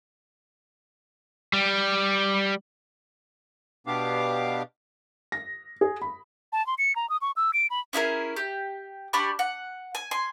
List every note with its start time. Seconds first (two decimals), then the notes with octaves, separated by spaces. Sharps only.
1.53 G3
3.87 B2 B3 D4 G4 F5 D6
5.32 A#6
5.81 G#4
6.02 B5
6.52 A5
6.67 C6
6.78 C#7
6.96 A#5
7.09 D#6
7.22 C#6
7.36 E6
7.53 D7
7.70 B5
7.93 C#4 E4 G#4 A#4
8.36 G4
9.13 D4 G4 B5 C#6
9.39 F#5
9.95 G#5
10.11 G#5 C6